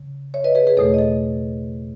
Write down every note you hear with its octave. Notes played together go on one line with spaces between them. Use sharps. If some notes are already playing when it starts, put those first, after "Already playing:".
Already playing: C#3
C#5 E5
B4 D#5
G#4 B4
G#4 B4
E2 B2 A3 A4 C#5
D#5
A4